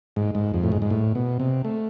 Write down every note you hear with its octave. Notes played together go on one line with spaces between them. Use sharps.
G#2
G#2
F2
A2
G#2
G#2
A2
B2
C3
A3